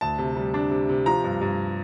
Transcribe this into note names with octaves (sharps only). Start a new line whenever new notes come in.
D2 A5
C3
G3
D4
C3
C3
F3 A#5
G2
G2